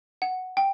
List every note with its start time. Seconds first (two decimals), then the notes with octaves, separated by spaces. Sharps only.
0.22 F#5
0.57 G5